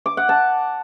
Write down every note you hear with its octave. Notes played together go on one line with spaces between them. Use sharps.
D6
F#5
A5